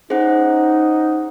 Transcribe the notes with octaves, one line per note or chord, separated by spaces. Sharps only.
C#4 D#4 G#4 C5 F#5